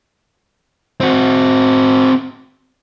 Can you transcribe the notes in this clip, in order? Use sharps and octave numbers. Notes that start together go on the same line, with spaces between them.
C4 F#4